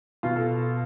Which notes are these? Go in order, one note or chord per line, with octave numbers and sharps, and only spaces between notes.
B2 F4
A4